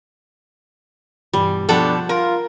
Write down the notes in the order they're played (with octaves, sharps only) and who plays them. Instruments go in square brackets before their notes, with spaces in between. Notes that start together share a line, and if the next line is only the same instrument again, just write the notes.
[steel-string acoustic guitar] G2 B2 E3 [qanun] G3
[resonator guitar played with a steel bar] B2 A4 [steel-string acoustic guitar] F3 [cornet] D4 [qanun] F#5 G5 D6
[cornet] F4 [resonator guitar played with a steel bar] A#4